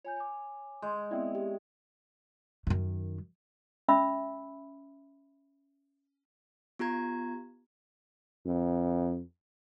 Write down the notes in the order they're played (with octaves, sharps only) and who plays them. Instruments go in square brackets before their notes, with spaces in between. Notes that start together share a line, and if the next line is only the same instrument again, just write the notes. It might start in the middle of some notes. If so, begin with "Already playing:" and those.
[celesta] F4 G#5 G6 [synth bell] C#5
[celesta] G#5 D6
[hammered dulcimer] G#3 [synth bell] G6
[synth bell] B3 C4 E4 [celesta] D5 E5 G5
[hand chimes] G4
[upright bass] F#2 D#3
[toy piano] C#4 E5 B5 E6
[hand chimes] B3 F4 G4 A#5 G#6
[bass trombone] F2